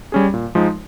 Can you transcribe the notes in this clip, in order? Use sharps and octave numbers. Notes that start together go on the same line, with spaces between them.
G3 C#4 G#4
A#2
F3 G#3 D#4